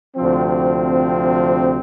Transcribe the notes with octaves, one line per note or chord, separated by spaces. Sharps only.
D2 C3 F3 C4